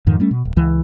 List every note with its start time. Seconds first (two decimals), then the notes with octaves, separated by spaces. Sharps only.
0.07 F2 G#2 D#3 F3
0.20 G3 A3 C#4
0.31 B2
0.45 D1
0.56 C#2 E3